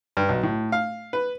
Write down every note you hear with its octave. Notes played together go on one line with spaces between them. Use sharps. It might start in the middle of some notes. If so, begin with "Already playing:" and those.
G2
B1
A2
F5
B4